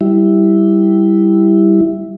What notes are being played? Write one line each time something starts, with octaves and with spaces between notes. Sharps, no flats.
G3 E4